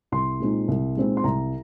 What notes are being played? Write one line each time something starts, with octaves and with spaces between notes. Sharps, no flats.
C2 C6
A#2 G#3 C4 D#4
C2
A#2 G#3 C4 D#4
C6
C2 A#5